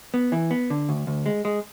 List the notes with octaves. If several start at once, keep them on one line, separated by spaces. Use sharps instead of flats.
B3
E3
B3
D3
D2
D2
G#3
G#3